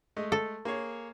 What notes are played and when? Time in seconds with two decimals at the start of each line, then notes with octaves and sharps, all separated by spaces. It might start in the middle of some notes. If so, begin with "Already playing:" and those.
0.16 G#3 A3 D#5
0.32 A4
0.65 A#3 G#4 C#5